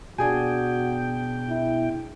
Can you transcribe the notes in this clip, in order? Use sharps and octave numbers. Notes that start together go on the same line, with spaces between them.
B2 D4 F#4 G#4 G5 G#5
E4